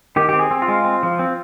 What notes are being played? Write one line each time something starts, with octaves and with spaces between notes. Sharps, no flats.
D#3 G4
C4 G4
G#4
C4
F4
G#3
C4
F3
C4